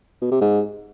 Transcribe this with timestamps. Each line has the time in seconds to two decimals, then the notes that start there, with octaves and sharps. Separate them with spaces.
0.22 B2
0.31 C3
0.41 G#2